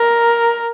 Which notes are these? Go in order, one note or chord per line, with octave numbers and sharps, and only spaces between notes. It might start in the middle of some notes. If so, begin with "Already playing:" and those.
Already playing: A#4